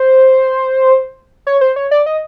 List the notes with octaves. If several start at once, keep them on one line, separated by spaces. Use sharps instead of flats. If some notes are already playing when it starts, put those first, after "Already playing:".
Already playing: C5
C#5
C5
C#5
D5
D#5